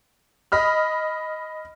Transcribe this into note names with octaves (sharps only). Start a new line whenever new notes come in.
D#5 B5 F6